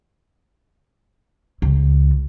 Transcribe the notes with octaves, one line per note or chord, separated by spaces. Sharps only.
C#2